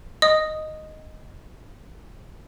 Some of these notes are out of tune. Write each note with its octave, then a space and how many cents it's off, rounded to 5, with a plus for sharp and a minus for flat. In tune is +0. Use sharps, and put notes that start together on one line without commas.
D#5 +0 D#6 +0